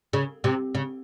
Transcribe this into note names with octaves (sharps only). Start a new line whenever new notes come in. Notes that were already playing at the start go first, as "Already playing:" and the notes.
C#3
C3
C#3